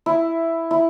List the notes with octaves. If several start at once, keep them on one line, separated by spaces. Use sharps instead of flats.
E4
E4